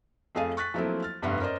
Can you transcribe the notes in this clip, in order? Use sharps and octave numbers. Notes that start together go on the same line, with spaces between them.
F2 A3 G#4 A4 F5 D#7
C#6 F#6 A6 B6
F3 F#3 A3 A#3 C4 E4
F6 A6
F1 G2 B3 E5 F#5
C#4 A#4 C5 D5 D#5